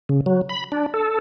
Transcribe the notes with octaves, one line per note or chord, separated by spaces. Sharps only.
C#3
F#3
B5
D4
A4